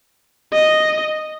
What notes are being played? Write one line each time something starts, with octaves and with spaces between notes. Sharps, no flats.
D#5